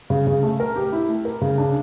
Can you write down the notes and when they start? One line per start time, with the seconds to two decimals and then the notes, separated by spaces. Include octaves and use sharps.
0.10 C#3
0.27 C#3
0.43 A3
0.60 A#4
0.76 G4
0.92 E4
1.09 A3
1.25 A#4
1.41 C#3
1.58 D4